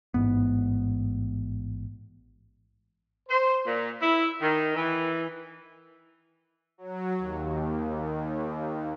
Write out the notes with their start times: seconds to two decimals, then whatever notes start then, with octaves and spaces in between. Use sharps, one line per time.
0.14 A1 G#2 B3
3.28 C5
3.66 A#2
4.00 E4
4.40 D#3
4.76 E3
6.78 F#3
7.18 D#2